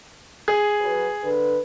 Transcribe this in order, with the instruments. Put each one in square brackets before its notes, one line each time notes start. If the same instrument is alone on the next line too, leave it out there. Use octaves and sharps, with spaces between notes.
[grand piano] G#4
[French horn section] F#3 B4
D3 B4